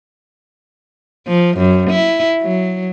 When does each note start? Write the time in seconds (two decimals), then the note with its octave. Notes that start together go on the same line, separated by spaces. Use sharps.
1.28 F3
1.58 F#2
1.90 E4
2.41 F#3